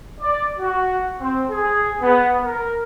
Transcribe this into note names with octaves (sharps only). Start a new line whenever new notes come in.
D5
F#4
C4
G#4
B3
A#4